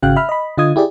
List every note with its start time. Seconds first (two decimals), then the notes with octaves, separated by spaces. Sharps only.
0.02 G#1 C#3 F#4 F5 G5 F#6
0.16 E5 B5 F6
0.29 D#5 B5
0.57 D3 F4 D#5 D#6 G#6
0.76 E4 G4 G#4 D5